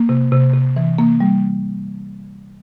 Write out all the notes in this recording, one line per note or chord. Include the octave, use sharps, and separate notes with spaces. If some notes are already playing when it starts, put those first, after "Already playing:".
Already playing: A#3
C3
C3
C3
E3
A#3
G3